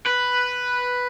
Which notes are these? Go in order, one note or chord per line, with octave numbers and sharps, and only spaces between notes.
B4